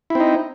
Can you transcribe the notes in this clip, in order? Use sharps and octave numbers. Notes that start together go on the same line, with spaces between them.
C4 D#4 E4